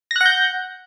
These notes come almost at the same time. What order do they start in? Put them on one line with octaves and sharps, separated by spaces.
A#6 F#6 F#5 G6